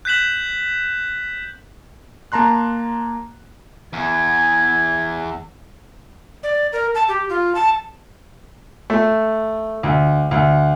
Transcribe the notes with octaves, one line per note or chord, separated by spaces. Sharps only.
F#6 G6 B6 E7 F#7
A#3 A5 A#5 C6 F#6
E2 G#6
D5
A#4
A5
G4
F4
A5
A3
D2
D2